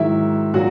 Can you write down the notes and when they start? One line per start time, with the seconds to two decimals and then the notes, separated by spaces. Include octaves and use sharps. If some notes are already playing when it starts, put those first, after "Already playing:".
Already playing: G#2 D#3 F#3 E4 E5
0.54 A#2 F#3 F#4 F#5